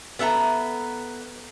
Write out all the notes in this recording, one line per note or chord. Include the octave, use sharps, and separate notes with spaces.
B3 A4 E5 A#5